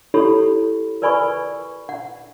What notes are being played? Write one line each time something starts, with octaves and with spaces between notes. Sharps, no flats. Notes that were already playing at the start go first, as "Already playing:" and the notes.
E4 G4 A4 C#5 B5
A#4 B4 D5 G#5 B5 C#6
F#5